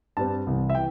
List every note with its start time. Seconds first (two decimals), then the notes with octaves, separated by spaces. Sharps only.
0.17 G2 G3 C4 A5
0.47 C2 C3 E3
0.70 E5
0.75 E3 G5